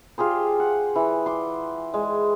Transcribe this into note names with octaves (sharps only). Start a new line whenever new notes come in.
F4 G4 G#4 C5
F#5
E3
C6 D6
G#3